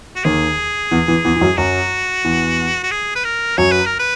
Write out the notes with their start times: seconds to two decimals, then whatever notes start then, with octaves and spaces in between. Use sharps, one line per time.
0.16 F#4
0.24 D#2 D#3 G#4
0.91 E2 E3
1.08 E2 E3
1.25 E2 E3
1.36 E3
1.41 F#2 F#3
1.57 F#2 F#3 F#4
2.24 E2 E3
2.84 F#4
2.91 G#4
3.16 B4
3.25 A#4
3.58 F#2 F#3 C#5
3.72 B4
3.86 A#4
3.99 B4